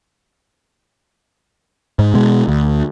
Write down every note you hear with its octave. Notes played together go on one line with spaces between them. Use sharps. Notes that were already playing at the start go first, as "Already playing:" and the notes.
G#2
B2 G#3
D2